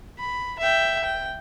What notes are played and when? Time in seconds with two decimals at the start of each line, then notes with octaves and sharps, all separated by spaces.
0.18 B5
0.59 E5 G5
1.03 G5